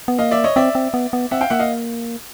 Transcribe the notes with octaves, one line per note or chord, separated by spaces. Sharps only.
B3
A#3 D#5 F5
D5 E5
C#5 D#5
C4 D5 E5
C4
B3
B3
C4 E5 F#5
F5 G5
A#3 E5 F#5
D#5 F5